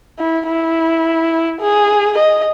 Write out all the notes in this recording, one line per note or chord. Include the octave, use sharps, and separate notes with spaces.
E4
E4
G#4
D#5